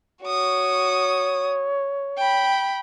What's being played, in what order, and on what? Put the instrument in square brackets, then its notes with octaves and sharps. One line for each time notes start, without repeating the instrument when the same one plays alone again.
[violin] F#4 D#6 [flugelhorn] C#5
[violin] G5 B5